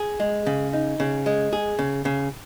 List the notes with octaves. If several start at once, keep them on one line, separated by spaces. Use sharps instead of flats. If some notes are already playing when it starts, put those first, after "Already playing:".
Already playing: G#4
G#3
C#3
D#4
C#3
G#3
G#4
C#3
C#3